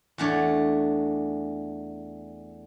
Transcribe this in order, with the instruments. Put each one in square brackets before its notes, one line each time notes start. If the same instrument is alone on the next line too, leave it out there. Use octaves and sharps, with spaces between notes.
[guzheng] E2 A3 D4 C#5